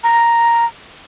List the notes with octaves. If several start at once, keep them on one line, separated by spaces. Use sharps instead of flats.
A#5